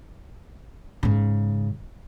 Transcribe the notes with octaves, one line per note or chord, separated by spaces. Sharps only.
G#2 C#3